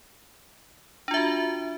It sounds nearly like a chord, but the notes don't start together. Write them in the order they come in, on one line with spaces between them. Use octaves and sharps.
D4 F4 E5 F#4